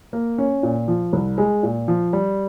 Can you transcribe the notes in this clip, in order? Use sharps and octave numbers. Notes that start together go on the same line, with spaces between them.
A#3
C#4
A#2
F3
C2
G#3
A#2
F3
G3